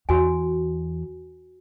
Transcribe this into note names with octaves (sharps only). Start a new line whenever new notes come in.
E2 F#4 G#5